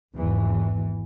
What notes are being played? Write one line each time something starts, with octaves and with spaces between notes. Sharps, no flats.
G#1 E2 E3